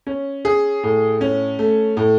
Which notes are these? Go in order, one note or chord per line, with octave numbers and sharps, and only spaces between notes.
C#4
G#4
A2
C#4
A3
A2